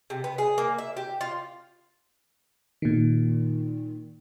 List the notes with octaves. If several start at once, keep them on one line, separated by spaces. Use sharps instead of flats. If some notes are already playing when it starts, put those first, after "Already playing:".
C3
B3
G#4
A#3
E5
G4
F4
A#2 D#3